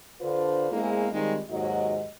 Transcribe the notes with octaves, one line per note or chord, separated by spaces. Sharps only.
D3 D4 F4 B4 C5
E2 G#3 A#3 C4 E4 G#4
D#3 G3 G#3 C4 D#4 F4
D#2 G#2 F#3 F#4 D#5